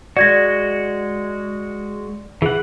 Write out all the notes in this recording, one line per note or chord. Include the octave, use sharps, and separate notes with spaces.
G#3 F#4 D5 G#6 A#6
E3 G#4 F#5